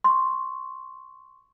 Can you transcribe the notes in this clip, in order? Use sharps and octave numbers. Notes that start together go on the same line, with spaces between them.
C6 C#6